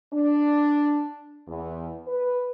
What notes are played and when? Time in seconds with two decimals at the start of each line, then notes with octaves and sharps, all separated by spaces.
0.14 D4
1.48 E2
2.08 B4